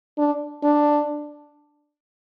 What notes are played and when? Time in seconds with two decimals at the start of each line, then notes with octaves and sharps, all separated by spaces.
0.18 D4
0.64 D4